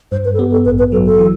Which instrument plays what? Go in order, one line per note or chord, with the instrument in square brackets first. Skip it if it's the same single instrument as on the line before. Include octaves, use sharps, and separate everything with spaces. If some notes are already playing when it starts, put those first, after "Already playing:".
[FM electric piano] G2 [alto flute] C5
[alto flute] B4
A4
[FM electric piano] B3 [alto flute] G4
[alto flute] A4
[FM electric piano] A1 [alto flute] B4
[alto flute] B4
[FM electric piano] F#3 [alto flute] A4
[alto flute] A4
[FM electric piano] E3